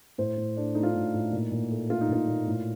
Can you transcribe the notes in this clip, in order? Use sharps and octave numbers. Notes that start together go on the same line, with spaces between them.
A2 C5
A2
A3 D4
A3 D#4
F4
A2 D#4
A2
A#2
A#2
A3
A3 F4
D#4
A#2 F4
A#2
A2